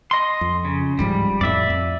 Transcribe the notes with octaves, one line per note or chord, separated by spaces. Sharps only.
D#5 C6
F2
C#3
D1 G#2 F3 G3
F2 A2 D5 E5
F2